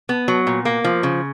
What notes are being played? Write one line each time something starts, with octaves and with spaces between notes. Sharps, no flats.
B3
F#3
A#2
A#3
F3
C#3